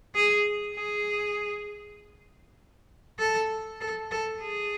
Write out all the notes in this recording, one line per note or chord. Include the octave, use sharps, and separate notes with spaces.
G#4
G#4
A4
A4
A4
G#4